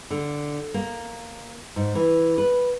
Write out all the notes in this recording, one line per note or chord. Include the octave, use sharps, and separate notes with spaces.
D3
A#3
G#2
E3
B4